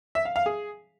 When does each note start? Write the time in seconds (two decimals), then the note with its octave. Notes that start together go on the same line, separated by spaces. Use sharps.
0.15 E5
0.25 F5
0.36 F5
0.46 G#4